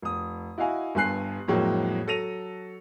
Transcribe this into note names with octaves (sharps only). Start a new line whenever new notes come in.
F1 D#6
E4 F#4 D#5 F5 G#5
G1 G2 G#5 F#6 C7
F2 A2 F#3 G#3 A#3
F#3 A4 A#6 D#7 F7